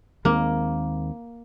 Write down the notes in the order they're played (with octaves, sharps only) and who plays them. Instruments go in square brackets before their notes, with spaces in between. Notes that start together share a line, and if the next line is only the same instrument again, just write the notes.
[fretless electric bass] D#2 D#3 G#3 C4 [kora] A#3